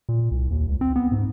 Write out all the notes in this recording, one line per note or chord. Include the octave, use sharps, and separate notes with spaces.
A#2
C2
D#2
C#2
C4
B3
G#2